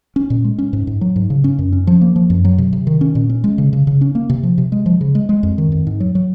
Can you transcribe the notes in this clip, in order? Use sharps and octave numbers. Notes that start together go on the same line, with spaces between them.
C#4
A#2
G#3
C#4
G#2
G#2
F#3
G#2
C#3
C#4
F#2
C#4
F3
A#3
F3
F#2
F#3
C3
C3
D#3
C#4
A#2
C#4
G#3
C#3
C#3
C#3
C#4
A#3
C3
F3
C3
G#3
F3
C#3
G#3
G#3
F2
D#3
F2
G#2
F#3
F#3